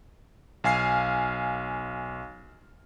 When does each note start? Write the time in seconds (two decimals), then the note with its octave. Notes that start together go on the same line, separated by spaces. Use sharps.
0.64 B1 F5 G#5 F6 C7